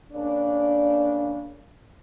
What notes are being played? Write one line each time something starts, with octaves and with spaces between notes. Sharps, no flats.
C#3 A#3 D4